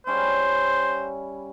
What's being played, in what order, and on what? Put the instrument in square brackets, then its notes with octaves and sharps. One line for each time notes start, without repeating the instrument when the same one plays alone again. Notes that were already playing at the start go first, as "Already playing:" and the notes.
[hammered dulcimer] G3 C#4 E4 [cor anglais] C5